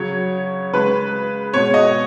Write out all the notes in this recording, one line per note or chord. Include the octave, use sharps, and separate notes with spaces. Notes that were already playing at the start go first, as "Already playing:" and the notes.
Already playing: C#3 F#3 C#5
C#3 G#3 B4
B2 G#3 C#5
D#5